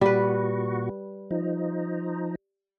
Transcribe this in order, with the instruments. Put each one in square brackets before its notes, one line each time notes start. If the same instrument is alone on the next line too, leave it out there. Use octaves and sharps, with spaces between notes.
[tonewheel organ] A#2 F#4 [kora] G3 B4
[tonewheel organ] F3 D#4